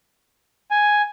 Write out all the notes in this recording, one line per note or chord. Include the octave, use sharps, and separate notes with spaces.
G#5